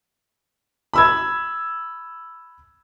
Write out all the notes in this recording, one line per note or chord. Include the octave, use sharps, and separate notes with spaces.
B5 E6 G#6